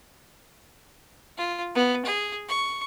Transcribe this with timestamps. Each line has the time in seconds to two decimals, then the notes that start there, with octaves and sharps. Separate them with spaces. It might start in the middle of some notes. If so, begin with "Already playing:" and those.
1.37 F4
1.75 B3
2.05 G#4
2.48 C#6